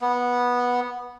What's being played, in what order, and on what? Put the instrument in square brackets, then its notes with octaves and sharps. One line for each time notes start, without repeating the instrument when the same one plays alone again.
[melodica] B3